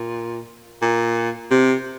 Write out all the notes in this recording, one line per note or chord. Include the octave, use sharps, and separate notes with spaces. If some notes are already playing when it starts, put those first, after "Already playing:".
Already playing: A#2
A#2
C3